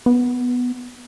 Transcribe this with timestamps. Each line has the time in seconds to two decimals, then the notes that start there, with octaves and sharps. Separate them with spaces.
0.06 B3